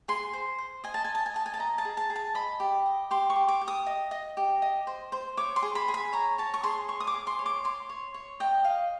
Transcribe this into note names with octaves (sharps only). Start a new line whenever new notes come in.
G#4 C6
C5
C5
D#5 G#5
A5
D#5 G#5
A5
G#5
D#5 A5
G#5
A5
D#5 A#5
A5
G#4
A5
G#4
A5
D#5 B5
G4
D#5
G4 C6
C#6
G4
D6
G4
D#6
D#5
D#5
G4
D#5
C5
C5
C#5 D6
C6
G#4
B5
G#4
B5
C#5 A#5
C#5 A5
C#6
G#4 C6
C#5 C#6
D#6
D6
G#4
C6
C#5
D6
C#5 C6
C#5
C#5
D#5 G5
D#5 F5